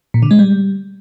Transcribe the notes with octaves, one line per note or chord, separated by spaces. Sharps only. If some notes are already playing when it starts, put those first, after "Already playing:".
A#2
D3
G#3
G3